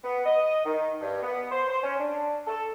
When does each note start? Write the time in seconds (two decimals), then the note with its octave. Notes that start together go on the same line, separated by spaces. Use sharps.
0.04 B3
0.26 D#5
0.65 D#3
1.01 G2
1.23 B3
1.51 C5
1.69 C5
1.83 C#4
1.99 D4
2.47 A4